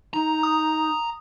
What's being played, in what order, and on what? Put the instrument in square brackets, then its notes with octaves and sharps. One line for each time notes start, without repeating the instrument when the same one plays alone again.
[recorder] D#4 [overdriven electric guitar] A#5
[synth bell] D#6